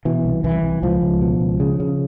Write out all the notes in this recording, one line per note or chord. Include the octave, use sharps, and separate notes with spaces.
B2 E3
C2
C2 E3
C2
C#2 F3
C#2
B2
C#2
C#3
C#3